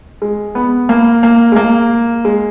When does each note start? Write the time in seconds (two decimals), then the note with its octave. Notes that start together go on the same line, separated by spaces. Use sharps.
0.22 G#3
0.55 B3
0.89 A#3
1.23 A#3
1.52 G#3
1.56 A#3
2.25 G#3